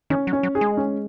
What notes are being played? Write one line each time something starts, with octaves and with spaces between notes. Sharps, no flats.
D#3 C#4
F#3
C#4
F#3
G#4
G#3
C#4